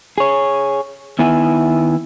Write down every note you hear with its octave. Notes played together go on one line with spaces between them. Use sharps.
G#4 C#5
D#3 B3 E4 E5 G#5